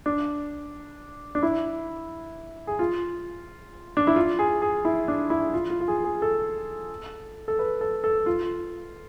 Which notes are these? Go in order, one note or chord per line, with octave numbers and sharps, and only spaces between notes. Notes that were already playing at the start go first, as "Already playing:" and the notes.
D4
D4
E4
G#4
F4
D4
E4
F4
G#4
G#4
E4
D4
E4
F4
F4
F4
G#4
G#4
A4
A4
B4
A4
A4
F4